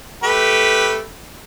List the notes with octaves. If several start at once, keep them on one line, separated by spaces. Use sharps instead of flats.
A3 G4 B4